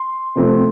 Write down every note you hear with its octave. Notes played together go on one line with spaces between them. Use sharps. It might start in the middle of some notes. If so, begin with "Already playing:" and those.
Already playing: C6
C3 F3 A3 C4